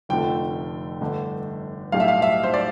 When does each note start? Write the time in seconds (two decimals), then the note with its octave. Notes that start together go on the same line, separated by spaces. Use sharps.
0.09 F1 F2 D3 F3 A3 G5
1.01 G1 G2 D3 A3 D4
1.92 B1 A2 G3 F5
2.00 E5
2.08 F5
2.22 E5
2.43 C5
2.54 D5